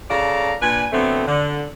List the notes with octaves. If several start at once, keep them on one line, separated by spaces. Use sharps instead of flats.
C#3 A4 D5 F5 A5 A#5
A#2 D4 B4 G#5
D3 F#3 A3 B3 C4
D3